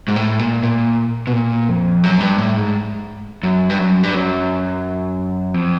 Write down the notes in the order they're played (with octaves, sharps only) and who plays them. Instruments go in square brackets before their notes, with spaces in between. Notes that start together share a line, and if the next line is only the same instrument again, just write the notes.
[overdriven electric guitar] G#2
A2
A#2
A#2
B2
A#2
F2
F#2
G2
A2
G#2
F#2
G2
F#2
G2
F#2
F2